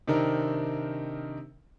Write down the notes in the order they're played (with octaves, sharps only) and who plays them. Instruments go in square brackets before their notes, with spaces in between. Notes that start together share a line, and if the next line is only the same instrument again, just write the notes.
[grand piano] C3 D#3 C4 D4 D#4 A#4